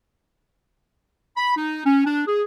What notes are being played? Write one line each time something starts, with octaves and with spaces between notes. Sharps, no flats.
B5
D#4
C#4
D4
G#4